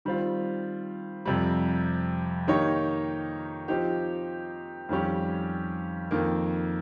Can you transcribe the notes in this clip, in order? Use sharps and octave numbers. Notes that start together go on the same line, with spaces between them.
D#3 G3 C4 F4
F2 C3 G3
D#3 A#3 D#4 G4 C#5
F3 C4 D#4 G4
F2 D#3 G3 C#4 G4
F2 D#3 A#3